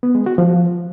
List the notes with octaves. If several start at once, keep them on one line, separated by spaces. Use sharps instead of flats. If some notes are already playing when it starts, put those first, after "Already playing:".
B3
G#3
F#4
F3